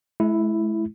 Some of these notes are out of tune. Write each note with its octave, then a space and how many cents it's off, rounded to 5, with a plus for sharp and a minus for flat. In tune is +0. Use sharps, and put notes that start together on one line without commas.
G#3 +45 E4 +0